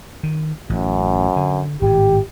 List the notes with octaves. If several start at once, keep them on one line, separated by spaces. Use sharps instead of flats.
D#3
A1 F#2
D3
G#1 A2 G4